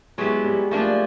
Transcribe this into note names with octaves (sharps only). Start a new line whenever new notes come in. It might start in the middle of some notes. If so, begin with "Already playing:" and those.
F#3 G#3 B3 E4 G4
G3
F3 A3 A#3 D4 F4